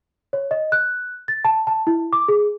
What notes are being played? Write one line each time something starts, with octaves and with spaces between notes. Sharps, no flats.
C#5
D#5
F#6
A6
A5
A5
E4
D6
G#4